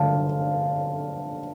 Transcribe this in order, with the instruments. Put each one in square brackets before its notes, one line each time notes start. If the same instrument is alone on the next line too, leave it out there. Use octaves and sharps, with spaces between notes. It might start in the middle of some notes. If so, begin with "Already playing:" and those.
Already playing: [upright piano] D3 F5 A5